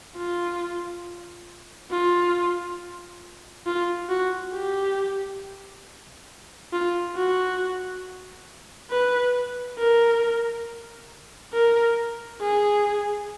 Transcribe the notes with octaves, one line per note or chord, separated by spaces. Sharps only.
F4
F4
F4
F#4
G4
F4
F#4
B4
A#4
A#4
G#4